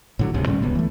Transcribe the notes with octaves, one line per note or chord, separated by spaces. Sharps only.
A2 D3 F#3
D1 C#2 G#2 C3
A2 D3 G3 C#4
D1 C#2 B3
E3 A3